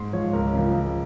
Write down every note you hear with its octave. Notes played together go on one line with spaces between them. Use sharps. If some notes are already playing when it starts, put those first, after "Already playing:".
Already playing: G#2 C6
F3 C#5
C#2 A#4
C#3 F3
C#2